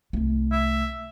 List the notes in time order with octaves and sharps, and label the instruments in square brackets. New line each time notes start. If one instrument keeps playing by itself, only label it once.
[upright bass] C2 A3
[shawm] E5